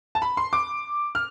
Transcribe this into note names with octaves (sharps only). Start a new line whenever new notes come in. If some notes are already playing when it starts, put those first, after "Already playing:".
A5
B5
C6
D6
F6